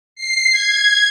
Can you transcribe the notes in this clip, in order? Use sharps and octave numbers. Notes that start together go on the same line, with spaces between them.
C7
G#6